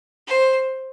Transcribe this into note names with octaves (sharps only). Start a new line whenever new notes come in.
C5